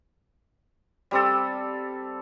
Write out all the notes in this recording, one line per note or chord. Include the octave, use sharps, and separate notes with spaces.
G3 C4 A4